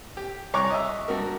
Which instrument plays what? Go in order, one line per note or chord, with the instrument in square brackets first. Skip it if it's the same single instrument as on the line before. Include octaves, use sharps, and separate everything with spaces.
[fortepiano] G4
C2 C#5 A#5 C#6 D6 F#6
D#5 E5
G2 F#4 A#4